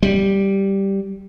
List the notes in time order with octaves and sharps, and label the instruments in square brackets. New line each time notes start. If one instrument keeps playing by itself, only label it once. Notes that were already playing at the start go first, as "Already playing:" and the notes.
[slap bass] G3